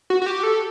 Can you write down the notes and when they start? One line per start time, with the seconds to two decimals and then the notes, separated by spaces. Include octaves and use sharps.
0.10 F#4
0.22 F#4
0.26 G4
0.43 A4